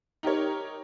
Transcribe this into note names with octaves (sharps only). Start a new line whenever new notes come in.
D#4 G4 A#4 C#5